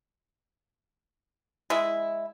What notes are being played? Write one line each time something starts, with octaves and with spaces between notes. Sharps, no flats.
G#3 E4